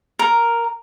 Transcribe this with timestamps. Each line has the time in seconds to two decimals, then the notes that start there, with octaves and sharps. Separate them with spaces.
0.19 A#4